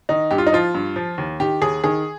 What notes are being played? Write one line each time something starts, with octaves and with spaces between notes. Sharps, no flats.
D#3 D#4
G2 G4
F4
D#4
F3 F4
G2
F3
D#2
D#3 G4
D#2 G#4
D#3 G#4